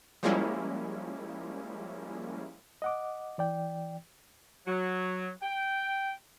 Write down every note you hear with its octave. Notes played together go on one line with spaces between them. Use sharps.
F3 G3 G#3 A#3 C#4 E4
D#5 F#5 D6
E3 D5 G5
F#3
G5